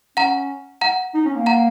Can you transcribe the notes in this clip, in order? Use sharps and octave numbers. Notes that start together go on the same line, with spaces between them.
C#4 F#5 A#5
F#5 A#5
D#4
C#4
A#3
F#5 A#5